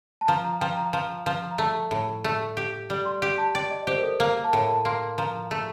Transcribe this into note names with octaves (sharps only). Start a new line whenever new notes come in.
A5
F3 A#5
A#5
F3 G5
A#5
F3
F3
A#5
A3 A5
A2
A3
G4
G3
C6
G4
A5
D5 G5
D#5
G4 C5
A#4
A4
A#3 A#4
A5
A2 G5
A5
A#3 C6
F3 A#5
A3